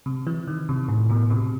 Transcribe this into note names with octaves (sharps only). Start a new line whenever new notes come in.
C3
E3
D#3
C3
A2
B2
C3